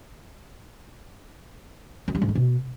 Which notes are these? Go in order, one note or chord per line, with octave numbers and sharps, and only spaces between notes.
F#2
G3
G#2
D3
B2